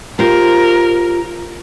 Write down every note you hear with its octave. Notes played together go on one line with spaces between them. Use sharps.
F4 G4 A#4 C5